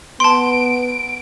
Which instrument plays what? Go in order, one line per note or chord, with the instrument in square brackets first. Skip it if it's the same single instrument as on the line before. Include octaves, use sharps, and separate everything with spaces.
[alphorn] B3 [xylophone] A5 C6 [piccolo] D7